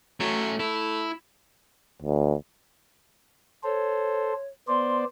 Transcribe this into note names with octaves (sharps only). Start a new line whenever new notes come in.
F#3 A3 C#4
A3 E4
D2
A4 C5 C#5
B3 C5 D5 C6